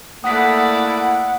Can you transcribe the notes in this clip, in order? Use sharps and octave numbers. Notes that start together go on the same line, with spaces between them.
A3 A#3 E4 D5 F#5 D#6 B6